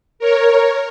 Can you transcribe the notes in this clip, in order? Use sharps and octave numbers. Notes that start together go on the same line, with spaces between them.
A#4 C#5